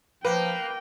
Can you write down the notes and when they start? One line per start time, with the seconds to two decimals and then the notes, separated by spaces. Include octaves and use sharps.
0.25 F3 A#3 B4 G5